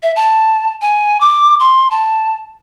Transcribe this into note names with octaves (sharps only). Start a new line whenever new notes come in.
E5
A5
G#5
D6
C6
A5